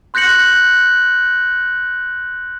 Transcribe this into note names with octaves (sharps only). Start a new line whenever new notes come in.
C6 F#6 G6 A#6 C#7 F#7